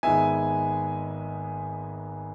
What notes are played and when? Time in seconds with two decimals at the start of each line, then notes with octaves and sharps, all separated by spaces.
0.03 G#1 G#2 G#3 B3 E5 G#5